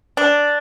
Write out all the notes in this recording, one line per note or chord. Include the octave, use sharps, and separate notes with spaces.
D4